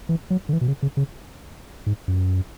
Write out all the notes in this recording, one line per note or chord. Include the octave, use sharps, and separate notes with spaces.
E3
F#3
D3
E3
B2
C#3
C#3
C#3
G#2
F#2